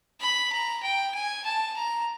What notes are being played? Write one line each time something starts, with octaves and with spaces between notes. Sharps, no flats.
B5
A#5
G5
G#5
A5
A#5